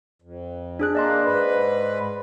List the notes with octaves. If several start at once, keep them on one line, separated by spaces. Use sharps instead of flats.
F2
D4 G#4 F#6
A#3 D5 D#5 C6
G#2 B4